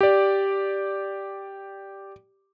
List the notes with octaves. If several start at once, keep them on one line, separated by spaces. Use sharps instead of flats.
G4 D5